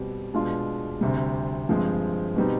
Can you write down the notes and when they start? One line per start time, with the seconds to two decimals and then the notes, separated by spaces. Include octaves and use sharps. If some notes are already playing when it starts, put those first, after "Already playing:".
Already playing: B2 G3 C4
0.34 B2 G#3 D4 F4
1.01 D2 C3 G3
1.69 G2 F3 G#3 C4
2.36 B2 G3 C4 D#4